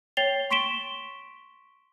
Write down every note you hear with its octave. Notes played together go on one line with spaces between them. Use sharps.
C#5 G5 A6 C7 F7 G7
C6 C#6 B6 D7 E7 G7